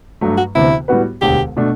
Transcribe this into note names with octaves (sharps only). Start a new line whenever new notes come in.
G2 F#3 A3
F#4
D2 C3 E3 B3 E4
A2 G3 B3 F#4 B4
E1 D2 D3 G4
B2 A3 D4